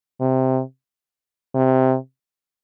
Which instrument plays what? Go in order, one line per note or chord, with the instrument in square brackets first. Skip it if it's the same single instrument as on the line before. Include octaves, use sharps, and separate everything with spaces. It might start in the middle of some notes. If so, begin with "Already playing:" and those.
[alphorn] C3
C3